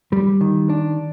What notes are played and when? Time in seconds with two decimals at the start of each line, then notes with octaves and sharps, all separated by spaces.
0.12 G3
0.41 D#3
0.70 D4